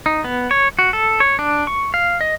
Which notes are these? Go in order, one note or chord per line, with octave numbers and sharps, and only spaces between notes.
D#4
B3
C#5
F#4
A4
C#5
D4
C#6
F5
D#5